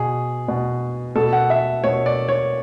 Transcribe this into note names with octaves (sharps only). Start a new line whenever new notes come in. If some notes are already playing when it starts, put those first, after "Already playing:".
Already playing: B2 G#4
B2
B2 A4
F#5
E5
B2 C#5
D5
C#5